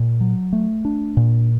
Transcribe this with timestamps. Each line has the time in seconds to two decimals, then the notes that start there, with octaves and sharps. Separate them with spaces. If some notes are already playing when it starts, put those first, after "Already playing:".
Already playing: A#2
0.20 F#3
0.53 A3
0.85 D4
1.17 A#2